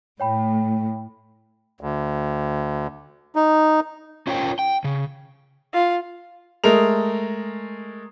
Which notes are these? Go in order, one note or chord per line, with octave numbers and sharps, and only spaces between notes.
A2 C#5 G5 B5
D2
D#4
C#4 F4 A#4 C5 C#5 G5
G5
C#3
F4
G#3 A3 A#4 F7